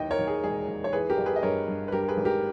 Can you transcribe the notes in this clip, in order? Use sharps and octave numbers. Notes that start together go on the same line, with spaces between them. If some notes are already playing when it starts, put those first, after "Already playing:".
Already playing: D#2 E3 D#5 G5
A#4 C#5
D#2
G#4
E1 G#4
D#2
C#5
E3 G#4 B4
G4 A#4
G1
G#4 B4
D#5
G2 A#4 C#5
G2
B4
G2 G4 A#4
A#4
G#4 B4
G#1
G4 A#4